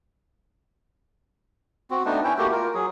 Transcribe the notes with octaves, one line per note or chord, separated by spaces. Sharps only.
C4 F#4
A3 B3 D4 D#4
C#4 E4 G5
A3 A#3 F#4 G4
F4 A#4
F#3 G#4